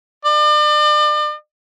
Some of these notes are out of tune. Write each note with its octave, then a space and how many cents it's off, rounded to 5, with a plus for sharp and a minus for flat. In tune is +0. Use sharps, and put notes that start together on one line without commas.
D5 +40